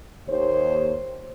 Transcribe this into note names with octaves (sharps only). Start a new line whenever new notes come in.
D#2 C5 C#5